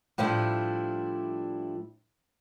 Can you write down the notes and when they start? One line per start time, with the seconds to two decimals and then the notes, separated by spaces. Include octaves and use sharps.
0.18 A2 F3 G3 D4 E4